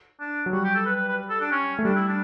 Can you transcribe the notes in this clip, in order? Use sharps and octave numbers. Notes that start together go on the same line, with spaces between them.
D4
F#3
G3 F#4
G4
A4
B4
B4
B4
A4
D4
C#4
A3
G3 D4
E4
D4